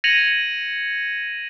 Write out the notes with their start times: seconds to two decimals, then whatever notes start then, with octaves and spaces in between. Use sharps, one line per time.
0.04 G#6 A#6 C#7 D#7 F7 F#7